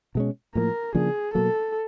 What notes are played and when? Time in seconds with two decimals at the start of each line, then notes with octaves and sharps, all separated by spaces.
0.15 B2 G#3 C#4
0.55 A2 F3 A#3 A#4
0.95 C#3 F3 A#3 D4 G#4
1.34 B2 F#3 A#3 A4